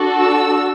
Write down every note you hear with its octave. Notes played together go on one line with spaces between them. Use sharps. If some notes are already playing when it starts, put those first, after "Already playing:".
Already playing: D4 F#4 A4
E6